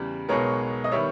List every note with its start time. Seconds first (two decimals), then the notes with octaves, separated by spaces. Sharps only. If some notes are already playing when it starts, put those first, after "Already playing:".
Already playing: E2 C#3 G3
0.29 B1 B2 G#3 B3 A#4 C#5
0.84 D#5
0.92 D#3 G3 B3 C#5 E5